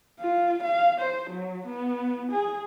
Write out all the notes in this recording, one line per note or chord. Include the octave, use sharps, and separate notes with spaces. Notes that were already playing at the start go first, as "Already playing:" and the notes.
F4
F5
C5
F#3
B3
G#4